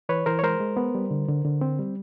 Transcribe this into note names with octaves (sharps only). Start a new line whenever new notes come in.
E3 B4 C#5
E3 A#4 C5
C#5
G#3 A#4 C5
G#3
B3
G3
D3
D3
D3
C4
G3